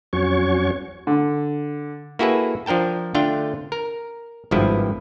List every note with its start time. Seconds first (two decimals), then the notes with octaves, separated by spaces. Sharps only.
0.13 F2 F#3 C#4 F#4 C#5 C#6
1.07 D3
2.19 A#3 E4 F#4 G#4 A4 B4
2.66 F3 D4 A#4 G5 A5
3.15 D3 A3 D4 F4 F5 G5
3.72 A#4
4.51 G#1 G2 B2 F3 E4 B4